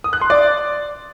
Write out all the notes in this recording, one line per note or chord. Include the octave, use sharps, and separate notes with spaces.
D#6
F#6
C6
D5